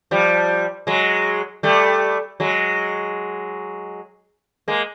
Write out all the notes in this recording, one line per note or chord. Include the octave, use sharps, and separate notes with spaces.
F3 G3
F#3 G#3
G3 A3
F#3 G#3
G#3 A#3